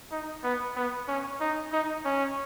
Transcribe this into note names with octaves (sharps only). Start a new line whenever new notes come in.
D#4
B3
B3
C#4
D#4
D#4
C#4